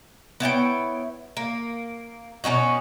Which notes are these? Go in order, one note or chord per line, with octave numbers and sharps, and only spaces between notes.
B3 E4 C#5 G5
A#3
B2 C#4 D#4 F#4